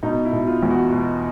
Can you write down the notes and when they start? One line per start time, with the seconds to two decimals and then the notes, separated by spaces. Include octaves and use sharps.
0.03 B2 D#4
0.25 E4
0.33 B2
0.47 F4
0.63 E2
0.70 F#4
0.92 B2